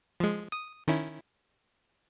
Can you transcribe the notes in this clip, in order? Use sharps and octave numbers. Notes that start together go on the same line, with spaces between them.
F3 G#3
D#6
D#3 C#4 E4